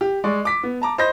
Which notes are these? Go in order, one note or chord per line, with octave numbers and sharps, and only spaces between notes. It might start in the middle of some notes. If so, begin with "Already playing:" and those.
G4
G#3 D5 C#6
D6 B6
B3
A5 A#5 D6
C5 D#5 B5 G6 A#6